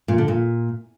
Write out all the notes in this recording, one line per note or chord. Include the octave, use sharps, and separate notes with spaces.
A#2
D3
A#2